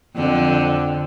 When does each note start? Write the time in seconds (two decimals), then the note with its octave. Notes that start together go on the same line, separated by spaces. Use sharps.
0.15 F2 D3